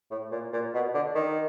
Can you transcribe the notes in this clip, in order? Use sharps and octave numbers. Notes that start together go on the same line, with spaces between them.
A2
A#2
A#2
B2
D3
D#3